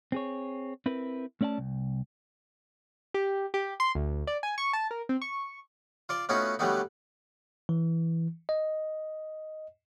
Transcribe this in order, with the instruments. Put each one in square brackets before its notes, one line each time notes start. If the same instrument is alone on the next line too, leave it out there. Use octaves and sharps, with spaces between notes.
[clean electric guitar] C4 G#4 C#5
C4 E4 A#4 B4
A3 C#4 D5 F5 A5
C2
[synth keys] G4
G4
C6
D2
D5
G#5
C#6
A5
A#4
C4
C#6
[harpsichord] F4 D5 C6
A3 B3 C#4 D#4 F4 F#4
D3 F#3 G3 A3 B3 D#4
[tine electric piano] E3
D#5